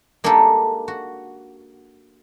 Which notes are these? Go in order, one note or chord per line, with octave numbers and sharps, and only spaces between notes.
G#3 A#3 D4 D#4 G4 A4
F#4